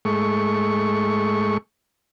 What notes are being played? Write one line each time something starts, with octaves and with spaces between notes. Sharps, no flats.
G#2 G#3 A3 C#6